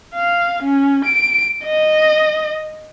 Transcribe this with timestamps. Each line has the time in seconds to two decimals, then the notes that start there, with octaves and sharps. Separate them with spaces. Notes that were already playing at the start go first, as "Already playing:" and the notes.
0.15 F5
0.63 C#4
1.05 D7
1.65 D#5